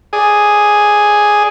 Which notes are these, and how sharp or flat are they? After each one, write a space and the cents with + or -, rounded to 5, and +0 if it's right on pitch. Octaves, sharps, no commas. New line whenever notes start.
G#4 +0 D5 +0